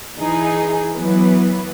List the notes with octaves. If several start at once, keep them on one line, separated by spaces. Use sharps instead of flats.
E3 D#4 G#4
E3 F#3 B3 B4